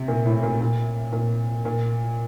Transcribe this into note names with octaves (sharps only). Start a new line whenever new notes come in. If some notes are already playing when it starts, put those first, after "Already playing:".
Already playing: C3
A#2
A2
A#2
A#2
A#2
A#2